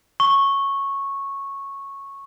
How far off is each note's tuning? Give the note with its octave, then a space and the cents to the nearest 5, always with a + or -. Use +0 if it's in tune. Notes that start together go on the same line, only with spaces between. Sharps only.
C#6 -10